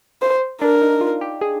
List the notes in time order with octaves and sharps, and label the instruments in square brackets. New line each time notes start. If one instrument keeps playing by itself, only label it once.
[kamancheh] C5
[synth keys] D4 [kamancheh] A#4
[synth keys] D#4
F4
G4
G#4